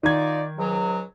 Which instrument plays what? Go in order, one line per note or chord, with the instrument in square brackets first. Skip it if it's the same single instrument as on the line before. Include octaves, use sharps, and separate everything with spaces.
[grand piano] D#3 G#6 [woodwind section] D#4 F4 D5
[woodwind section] C#2 G#2 F#3